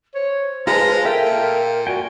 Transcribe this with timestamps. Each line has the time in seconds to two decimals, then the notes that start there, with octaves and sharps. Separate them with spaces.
0.15 C5 C#5
0.67 G#3 F4 B4 A5 A#5
1.05 A4 A#4 E5 F5 G5
1.25 A#2
1.87 F#4 D5 G5 G#5